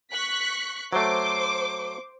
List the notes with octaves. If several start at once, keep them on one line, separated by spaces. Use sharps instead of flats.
C#6 F#6 B6
F#3 A3 C5 D6